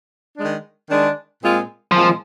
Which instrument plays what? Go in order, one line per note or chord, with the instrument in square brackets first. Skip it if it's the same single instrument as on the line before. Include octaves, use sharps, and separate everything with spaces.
[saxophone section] D#3 G#3 D4
D#3 G#3 D4
A#2 G#3 C4 F4
[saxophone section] A#2 G#3 C4 F4 [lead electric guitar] F3